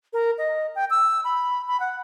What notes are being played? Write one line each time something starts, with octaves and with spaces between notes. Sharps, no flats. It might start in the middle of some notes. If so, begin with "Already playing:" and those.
A#4
D#5
G5
E6
B5
B5
F#5